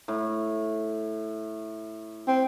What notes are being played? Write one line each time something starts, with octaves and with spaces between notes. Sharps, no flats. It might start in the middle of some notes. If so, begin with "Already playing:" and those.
A2
C4